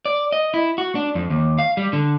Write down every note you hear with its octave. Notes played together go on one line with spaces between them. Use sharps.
D5
D#5
E4
F#4
D4
F2
D#2
F5
G3
D3